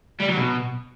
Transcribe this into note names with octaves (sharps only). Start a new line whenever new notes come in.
G3
F#3
B2